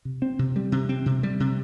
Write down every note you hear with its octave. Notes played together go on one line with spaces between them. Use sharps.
C3
C4
C3
G3
C3
C4
C3
G3
C3